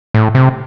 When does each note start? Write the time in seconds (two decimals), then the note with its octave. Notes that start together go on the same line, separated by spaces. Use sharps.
0.14 A2
0.35 C3